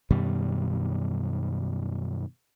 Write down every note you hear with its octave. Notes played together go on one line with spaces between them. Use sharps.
F#2 B2 D#3 G3